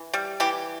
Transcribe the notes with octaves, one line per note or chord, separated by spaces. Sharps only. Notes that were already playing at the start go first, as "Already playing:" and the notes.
Already playing: E3
G3
E3 G4